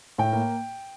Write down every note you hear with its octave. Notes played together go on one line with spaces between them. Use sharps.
A2 G5
A#3